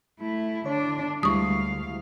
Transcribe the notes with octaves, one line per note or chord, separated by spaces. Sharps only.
A3 E4
D3 D4 C#5
D2 G3 G#3 E4 F5 C#6 D#6